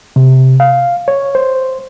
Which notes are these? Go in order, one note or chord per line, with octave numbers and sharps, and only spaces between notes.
C3
F5
C#5
C5